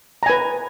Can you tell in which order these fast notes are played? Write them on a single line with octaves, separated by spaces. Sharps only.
A#5 G#5 B4